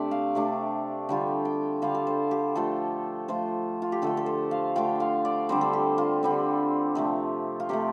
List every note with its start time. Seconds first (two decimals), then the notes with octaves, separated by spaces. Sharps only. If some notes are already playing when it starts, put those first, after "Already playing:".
Already playing: C3 A3 D4 C5 D5
0.11 F5
0.35 C3 A3 D4
1.09 D3 G3 F4 G5
1.45 G5
1.82 D3 G3 F4 F5
1.95 A4
2.07 C5
2.31 G4
2.56 F3 A3 F4 A4
3.28 F3 A3 F4 C5
3.82 F4
3.92 G4
4.02 D3 A3 F4 A4
4.17 A4
4.26 C5
4.51 F5
4.76 D3 A3 F4 G5
5.00 F5
5.25 D5
5.49 D3 G3 C4 C5
5.61 A4
5.73 G4
5.98 F4
6.23 D3 G3 C4
6.95 C3 F3 A3
7.60 F4
7.69 C3 F3 A3 G4